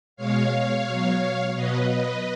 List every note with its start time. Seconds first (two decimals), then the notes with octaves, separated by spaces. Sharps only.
0.16 B2 G#3 C#5 F5
0.86 B2 F#3
1.54 B2 F#3 B4 D#5
1.89 B4 D#5